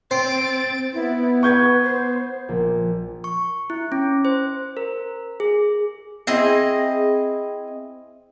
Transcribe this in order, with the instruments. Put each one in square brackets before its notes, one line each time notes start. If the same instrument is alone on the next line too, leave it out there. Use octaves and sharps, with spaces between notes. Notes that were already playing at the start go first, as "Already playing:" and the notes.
[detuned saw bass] C4 [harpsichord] C5 [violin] A6 D7
[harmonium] B3 [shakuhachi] E4
[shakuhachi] B4 [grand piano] C#6 G6 G#6
[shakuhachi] C5
[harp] A#1
[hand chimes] C#6
E4
C#4
C5
A#4
G#4
[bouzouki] C4 E4 G#4 D#5